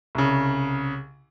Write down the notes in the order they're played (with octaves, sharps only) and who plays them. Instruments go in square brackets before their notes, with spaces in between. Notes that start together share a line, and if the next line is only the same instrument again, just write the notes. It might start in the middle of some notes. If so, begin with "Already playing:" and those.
[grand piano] C2 C#3